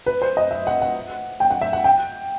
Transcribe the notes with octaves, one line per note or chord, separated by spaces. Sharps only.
B4
C5
D#5
E5
F#5
F#5
G5
F#5
E5
F#5
G5